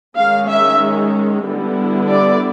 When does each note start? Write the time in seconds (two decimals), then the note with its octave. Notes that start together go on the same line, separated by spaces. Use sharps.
0.16 D#3 G#3 C#4 F5
0.48 E5
1.46 D3 G3 B3 E4
2.10 D5